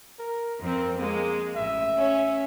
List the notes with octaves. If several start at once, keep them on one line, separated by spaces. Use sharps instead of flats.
A#4
F2 C4 A#4
G#3 A#3
A1 E5
C#4